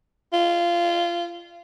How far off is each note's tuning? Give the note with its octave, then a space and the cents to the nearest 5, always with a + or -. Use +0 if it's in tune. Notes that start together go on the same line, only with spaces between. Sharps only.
F4 -20